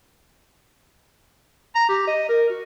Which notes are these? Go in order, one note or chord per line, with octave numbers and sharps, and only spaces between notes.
A#5
G4
D#5
A#4
F#4